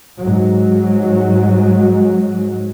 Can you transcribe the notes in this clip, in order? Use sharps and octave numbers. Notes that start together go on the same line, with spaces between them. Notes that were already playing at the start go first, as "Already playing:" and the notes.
G#2 F#3